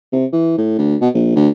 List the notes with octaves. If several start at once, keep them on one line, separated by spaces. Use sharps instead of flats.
C3
E3
A2
D2
B2
A#1
D2